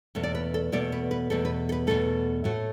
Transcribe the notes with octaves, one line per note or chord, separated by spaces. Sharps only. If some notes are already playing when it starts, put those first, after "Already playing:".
E2 B2 A3
D5
B4
A4
E2 B2 A3 D5
B4
B4
E2 B2 A3 A4
B4
A4
B4
E2 B2 A3 A4
A2 A3 F#4